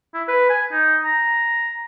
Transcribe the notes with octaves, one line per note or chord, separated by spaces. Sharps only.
E4
B4
G#5
D#4
A#5